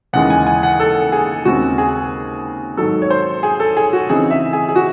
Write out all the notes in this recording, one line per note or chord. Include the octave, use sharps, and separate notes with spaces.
D#2 C#3 E3 G#3 F#5
G#5
G#5
F#5
A4
G#4
D#2 C#3 G#3 C4 F#4
G#4
G#2 D#3 F#3 A4
C#5
C5
G#4
A4
G#4
F#4
C#3 E3 C4 D#4 G#4
E5
G#4
G#4
F#4